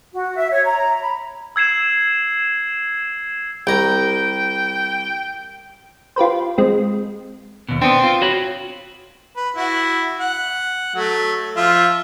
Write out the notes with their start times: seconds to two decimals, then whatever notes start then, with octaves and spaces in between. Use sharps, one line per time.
0.14 F#4
0.37 E5
0.51 C#5
0.65 A#5
1.01 B5
1.56 E6 G#6 C7 E7
3.67 C2 G5 A#5
6.16 F4 G4 B4 C5
6.58 G#3 C4
7.69 D#2 B2
7.81 B3 C4 D4
8.03 F4
8.22 F#4 C#5 B5
9.37 B4
9.57 E4 F#4
10.20 F#5
10.95 F#3 A3
11.56 F3 F4 E5